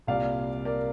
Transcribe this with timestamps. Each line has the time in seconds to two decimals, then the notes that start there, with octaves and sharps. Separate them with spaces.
0.07 C2 A#2 G3 D5 F5
0.65 A#4 D5